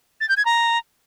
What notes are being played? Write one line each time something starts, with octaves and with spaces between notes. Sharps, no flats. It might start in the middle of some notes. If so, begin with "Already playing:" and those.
A6
G6
G#6
A#5